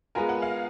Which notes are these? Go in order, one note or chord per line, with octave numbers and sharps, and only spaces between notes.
G#3 B3 F4 A#4 G#5
F#5
F5